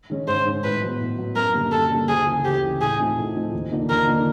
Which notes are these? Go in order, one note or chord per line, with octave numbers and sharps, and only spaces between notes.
D#3 G#3 C#4
G#2 C5
D#3 G#3 C#4
A2 B4
F#3 B3
A2
F#3 B3
F#2 A#4
D3 G3 A#3
F#2 A4
D3 G3 A#3
D2 G#4
C#3 E3
D2 G4
C#3 E3
A2 G#4
F3 A3 C4 D#4
A2
F3 A3 C4 D#4
D#2
D3 F3 A#3 D#4
D#2 A#4
D3 F3 A#3 D#4